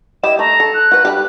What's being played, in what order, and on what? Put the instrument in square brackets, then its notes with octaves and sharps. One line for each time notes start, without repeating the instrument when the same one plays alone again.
[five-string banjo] E4 G4 D#5 [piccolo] E7
[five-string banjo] A3 [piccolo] A#5
[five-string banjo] A4
[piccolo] F#6
[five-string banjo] F#4 B4
G4 A#4 B5